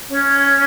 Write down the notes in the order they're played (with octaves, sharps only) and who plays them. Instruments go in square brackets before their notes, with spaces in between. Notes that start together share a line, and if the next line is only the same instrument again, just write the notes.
[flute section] C#4 C#5